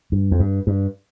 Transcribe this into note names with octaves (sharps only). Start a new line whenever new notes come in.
G2
F2
G2
G2